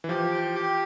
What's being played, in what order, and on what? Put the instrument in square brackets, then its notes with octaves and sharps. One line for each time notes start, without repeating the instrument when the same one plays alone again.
[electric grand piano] E3
[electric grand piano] F3 [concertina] G4
[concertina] G5
G4